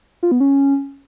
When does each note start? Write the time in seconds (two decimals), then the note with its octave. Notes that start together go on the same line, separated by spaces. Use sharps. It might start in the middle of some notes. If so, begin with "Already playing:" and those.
0.23 F4
0.32 B3
0.40 C#4